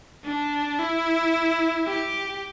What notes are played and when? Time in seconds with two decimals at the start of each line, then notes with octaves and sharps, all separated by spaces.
0.24 D4
0.79 E4
1.87 G4